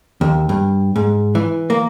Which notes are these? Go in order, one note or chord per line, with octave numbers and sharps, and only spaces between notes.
D#2
G2
G#2
E3
A#3